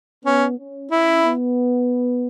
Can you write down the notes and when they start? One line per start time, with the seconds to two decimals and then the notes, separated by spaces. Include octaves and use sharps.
0.25 B3 C#4
0.58 C#4
0.91 C#4 E4
1.24 B3